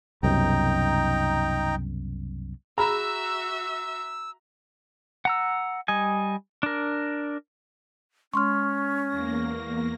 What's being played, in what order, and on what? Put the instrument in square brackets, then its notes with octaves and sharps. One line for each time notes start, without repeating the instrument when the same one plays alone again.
[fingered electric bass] C2 F#2 B2 [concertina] D#4 G5 A#5
[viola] F#4 E5 [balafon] G#4 B5 [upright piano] A#5 [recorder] E6
[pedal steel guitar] F#5 A#5 E6
G3 D#5 G#5
D4 A#4
[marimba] G#3 C6 [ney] C#4 [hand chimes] C#6 F6
[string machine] E2 A#3 A#6